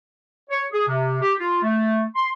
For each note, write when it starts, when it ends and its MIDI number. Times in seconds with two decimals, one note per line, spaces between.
0.50 0.64 73
0.72 0.86 68
0.88 1.17 48
1.21 1.33 67
1.39 1.58 65
1.62 2.04 57
2.16 2.31 84